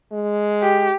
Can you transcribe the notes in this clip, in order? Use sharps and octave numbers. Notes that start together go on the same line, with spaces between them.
G#3
G4